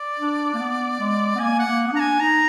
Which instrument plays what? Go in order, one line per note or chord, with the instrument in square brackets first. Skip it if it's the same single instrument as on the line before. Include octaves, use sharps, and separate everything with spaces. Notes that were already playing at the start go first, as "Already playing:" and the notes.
Already playing: [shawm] D5
[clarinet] D4
A#3
B3
G#3
B3
[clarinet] A#3 [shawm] G#5
[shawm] F#5
[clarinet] A#3
B3
[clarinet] D4 [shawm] A#5
[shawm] G#5
[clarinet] D#4 [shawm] A#5